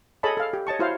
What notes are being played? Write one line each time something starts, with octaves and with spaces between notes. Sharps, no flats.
G#4 A4 C#5 D#5 A5 B5
A4 F5
G4
C#5 D#5 A5 C#6
E4 F#4 C5 C#5 F5